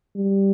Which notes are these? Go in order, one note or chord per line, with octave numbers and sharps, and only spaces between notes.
G3